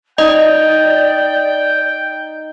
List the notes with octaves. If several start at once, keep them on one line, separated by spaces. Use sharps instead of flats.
D#4 D5 D#5 G5